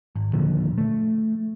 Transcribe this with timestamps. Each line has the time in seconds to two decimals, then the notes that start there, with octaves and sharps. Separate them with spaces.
0.16 G#1
0.33 D#2 A#2 D3 F3
0.78 A3